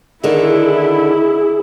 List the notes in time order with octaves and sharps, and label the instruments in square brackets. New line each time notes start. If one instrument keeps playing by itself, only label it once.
[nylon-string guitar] D3 D#3 [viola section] E4 [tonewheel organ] G#4